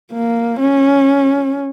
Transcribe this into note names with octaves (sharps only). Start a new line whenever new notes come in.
A#3
C#4